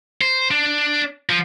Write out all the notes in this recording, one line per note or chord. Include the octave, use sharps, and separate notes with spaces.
C5
D4
F3